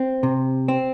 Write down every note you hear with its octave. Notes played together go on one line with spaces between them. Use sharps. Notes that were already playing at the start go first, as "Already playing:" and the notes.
Already playing: C4
C3
C4